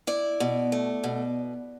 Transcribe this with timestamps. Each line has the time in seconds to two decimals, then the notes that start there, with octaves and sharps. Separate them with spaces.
0.07 E4 D5
0.40 B2
0.72 A3
1.04 B2